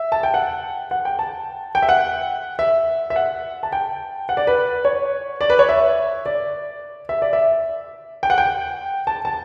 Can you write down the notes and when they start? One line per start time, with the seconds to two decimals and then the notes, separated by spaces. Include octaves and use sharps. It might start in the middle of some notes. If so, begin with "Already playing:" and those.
Already playing: E5
0.12 A5
0.23 G5
0.34 F#5
0.91 F#5
1.05 G5
1.19 A5
1.75 G5
1.82 E5
1.89 F#5
2.59 E5
3.10 E5
3.16 F#5
3.63 A5
3.72 G5
4.29 F#5
4.37 D5
4.47 B4
4.85 C#5
5.41 D5
5.50 B4
5.59 C#5
5.69 E5
6.26 D5
7.09 E5
7.22 D5
7.33 E5
8.23 G5
8.30 F#5
8.38 G5
9.07 A5
9.25 A5